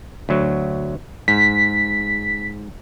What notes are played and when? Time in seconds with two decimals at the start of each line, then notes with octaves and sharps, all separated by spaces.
0.29 D2 F#3
1.28 G#2 B6